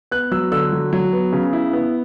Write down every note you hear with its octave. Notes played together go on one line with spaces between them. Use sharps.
B3 F#6
F#3 E6
D3 E6
F#3
F#3
B3
C#3
E4
B3